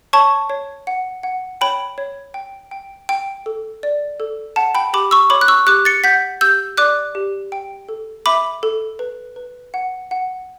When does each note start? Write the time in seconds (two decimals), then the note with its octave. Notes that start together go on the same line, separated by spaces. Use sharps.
0.13 C#5 A5 C#6
0.50 C#5
0.87 F#5
1.23 F#5
1.61 C#5 G5 B5
1.98 C#5
2.34 G5
2.71 G5
3.09 G5
3.46 A4
3.83 D5
4.20 A4
4.56 F#5 A5
4.75 G5 B5
4.93 G4 B5 D6
5.11 C#6 E6
5.30 C#5 B5 D6
5.41 F#6
5.48 C#6 E6
5.67 G4 D6 F#6
5.85 A6 C#7
6.04 F#5 G6 B6
6.41 G4 E6 G6
6.77 D5 D6 F#6
7.15 G4
7.52 G5
7.89 A4
8.26 E5 B5 D6
8.63 A4
8.99 B4
9.36 B4
9.74 F#5
10.11 F#5